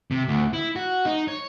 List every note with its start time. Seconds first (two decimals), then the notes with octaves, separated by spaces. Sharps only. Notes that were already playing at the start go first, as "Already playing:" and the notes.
0.11 C3
0.28 D2
0.53 E4
0.76 F#4
1.06 D#4
1.28 C#5